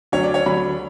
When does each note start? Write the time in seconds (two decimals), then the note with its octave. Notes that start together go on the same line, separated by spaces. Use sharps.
0.12 D2 D3 F#3 C#5
0.23 D5
0.34 C#5
0.46 D2 D3 F#3 B5